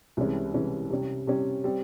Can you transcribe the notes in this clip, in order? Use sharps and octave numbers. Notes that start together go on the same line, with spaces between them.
C2 C3 E3 G#3 C#4
C2 C3 E3 G#3 C#4
C3 G3 C#4
C3 G3 C#4
G3 C4